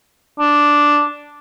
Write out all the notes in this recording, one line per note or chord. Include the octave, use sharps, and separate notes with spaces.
D4